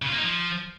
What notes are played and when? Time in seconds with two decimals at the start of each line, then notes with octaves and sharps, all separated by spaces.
0.02 C#3
0.07 F4
0.12 A#3
0.18 D#4
0.23 F3